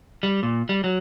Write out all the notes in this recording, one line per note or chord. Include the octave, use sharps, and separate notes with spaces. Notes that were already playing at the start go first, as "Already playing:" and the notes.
G3
A#2
G3
F#3